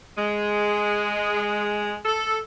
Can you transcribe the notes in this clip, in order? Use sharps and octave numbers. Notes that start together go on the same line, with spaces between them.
G#3
A4